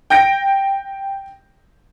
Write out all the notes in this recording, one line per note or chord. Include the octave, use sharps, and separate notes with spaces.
G5 G6 A#6 D7